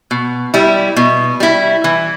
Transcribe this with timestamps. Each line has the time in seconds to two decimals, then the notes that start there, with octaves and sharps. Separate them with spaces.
0.11 B2
0.54 G3 E4
0.97 B2
1.40 G3 E4
1.84 E3